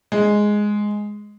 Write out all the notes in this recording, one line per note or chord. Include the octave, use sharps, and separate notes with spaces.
G#3